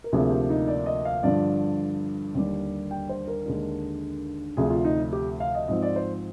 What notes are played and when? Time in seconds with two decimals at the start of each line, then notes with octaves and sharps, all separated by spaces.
0.04 A#4
0.12 D2 C3 F3 A#3 D4 G#4
0.31 G4
0.50 D#4
0.68 D5
0.86 D#5
1.05 F5
1.23 G2 D3 F3 D5
2.35 D#2 D3 G3
2.91 G5
3.09 C5
3.28 A#4
3.46 D#2 D3 G#3 D4
4.57 D2 C3 F3 G#4
4.70 F4
4.85 D#4
5.13 G4
5.40 F5
5.55 D#5
5.68 G#2 F3 C4 D#5
5.82 D5
5.96 C5